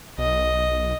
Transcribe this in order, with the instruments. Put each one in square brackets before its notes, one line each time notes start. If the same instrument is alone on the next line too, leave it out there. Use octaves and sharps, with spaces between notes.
[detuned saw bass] B1 [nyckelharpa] D#5